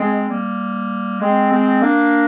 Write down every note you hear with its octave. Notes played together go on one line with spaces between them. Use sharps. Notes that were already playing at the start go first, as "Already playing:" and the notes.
Already playing: G#3 C4
G3 A#3
G#3 C4
G#3 C4
A#3 D4